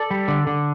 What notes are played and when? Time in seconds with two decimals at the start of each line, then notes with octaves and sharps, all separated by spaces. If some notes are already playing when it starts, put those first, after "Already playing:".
Already playing: A4 D5
0.11 G3
0.28 D3
0.47 D3